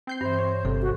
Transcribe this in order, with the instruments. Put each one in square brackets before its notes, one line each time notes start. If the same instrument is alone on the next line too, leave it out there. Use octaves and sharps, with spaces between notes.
[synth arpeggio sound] C4 G6 C7
[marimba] G2 E3 [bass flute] C5
[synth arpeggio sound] C#5
[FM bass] G1 [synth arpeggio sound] C3 [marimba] A4
[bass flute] F#4